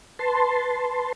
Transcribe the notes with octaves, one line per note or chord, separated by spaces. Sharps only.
B4 A5 C6